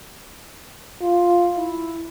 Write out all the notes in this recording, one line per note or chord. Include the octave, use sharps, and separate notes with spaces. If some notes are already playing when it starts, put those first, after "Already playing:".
F4
E4